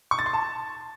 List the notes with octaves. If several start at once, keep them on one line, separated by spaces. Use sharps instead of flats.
C#6
A6
C6
A5